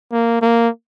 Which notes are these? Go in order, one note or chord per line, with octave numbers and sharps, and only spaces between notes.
A#3
A#3